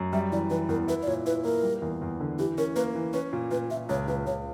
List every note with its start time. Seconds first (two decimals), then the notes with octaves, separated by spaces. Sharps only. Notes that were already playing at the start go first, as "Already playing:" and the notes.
Already playing: F#2
0.13 G3 E5
0.32 E3 D5
0.50 E3 B4
0.69 E2 A#4
0.87 E4 B4
1.02 D5
1.07 A#2 C#5
1.26 E4 B4
1.45 A#3 A#4
1.63 G3
1.82 E2
2.02 E2
2.20 D3
2.39 E3 G4
2.58 C#4 A#4
2.76 A#3 B4
2.95 E3
3.13 C#4 B4
3.33 A#2
3.51 A#2 B4
3.70 A#2 E5
3.89 C#2 C#5
4.08 C#2 B4
4.26 C#2 C#5